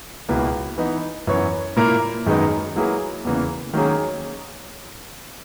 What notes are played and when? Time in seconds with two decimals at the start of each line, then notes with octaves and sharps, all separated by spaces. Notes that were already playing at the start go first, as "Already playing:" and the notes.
0.29 C#2 B2 A#3 E4 B4
0.78 E3 B3 D#4
1.27 F#2 E3 B3 F#4 C#5
1.77 A#2 A#3 E4 A#4
2.26 F#2 D#3 G#3 B3 D#4
2.76 F#3 A#3 E4 G#4 B4
3.25 E2 C#3 E3 A#3
3.74 D#3 F#3 A#3 C#4 G#4